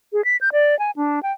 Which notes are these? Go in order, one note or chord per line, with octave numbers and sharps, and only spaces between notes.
G#4
B6
G6
D5
G#5
D4
G5